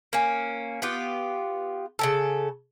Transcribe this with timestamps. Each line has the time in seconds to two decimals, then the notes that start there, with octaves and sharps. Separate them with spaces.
0.13 A#3 C#4
0.82 B3 F4 G4
1.99 C#3 E3 A4